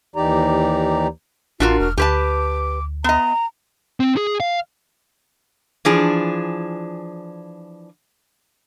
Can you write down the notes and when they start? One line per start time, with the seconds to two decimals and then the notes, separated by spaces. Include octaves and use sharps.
0.16 D#2 E3 D#4 G4 D5 A#5
1.60 A1 D4 F4 F#4 A#4
1.80 E1 F6
1.98 D2 G4 B4 A5 D6
3.04 B3 D#5 A#5
4.00 C4
4.17 G#4
4.40 F5
5.85 E3 F3 D4 G#4